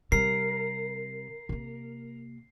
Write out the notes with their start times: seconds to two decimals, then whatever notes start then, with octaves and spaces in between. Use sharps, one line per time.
0.12 C3 G3 A#4 C7
1.49 C3 A#3